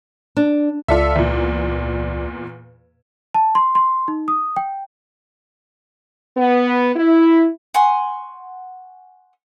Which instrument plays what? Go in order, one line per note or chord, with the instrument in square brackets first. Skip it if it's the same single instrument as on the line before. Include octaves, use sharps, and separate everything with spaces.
[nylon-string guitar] D4
[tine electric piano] C#2 D5 [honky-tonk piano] F4 A4 E5
[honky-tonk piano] E2 A#2
[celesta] A5
C6
C6
D#4
D#6
G5
[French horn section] B3
E4
[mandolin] F#5 G#5 C6 C#6